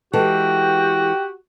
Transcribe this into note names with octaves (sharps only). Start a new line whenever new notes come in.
E3 G#3 F#4 G4 A4 G5